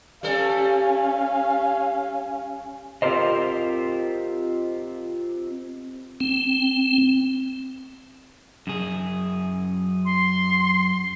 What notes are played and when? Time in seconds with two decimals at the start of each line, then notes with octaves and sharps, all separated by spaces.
0.23 G3 C#4 A4 F5
3.02 C4 F4 G4 A#4 C5 D#5
6.20 C4
8.67 F#2 G#4
10.05 C6